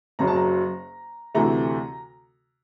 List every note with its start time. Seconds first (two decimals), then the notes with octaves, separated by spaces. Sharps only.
0.19 F#1 F#2 C#3 F#3 A#5
0.27 A5
0.36 A#5
1.35 D2 C3 E3 A3 A#5